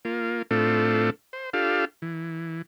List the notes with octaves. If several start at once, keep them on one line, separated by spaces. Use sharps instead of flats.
A#3 F4
A2 A3 C4 D4 F4 A4
C5
D4 F4 G4 A4 F5
E3